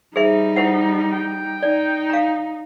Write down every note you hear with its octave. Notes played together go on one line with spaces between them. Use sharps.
G3 D#4 G#4 C5 E5
E4 C5 F#5
G5
D#4 D5
F5 A#5